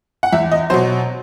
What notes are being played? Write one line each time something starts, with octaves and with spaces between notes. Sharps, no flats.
F#5
E2 E5
D#5
B2 F#3 C5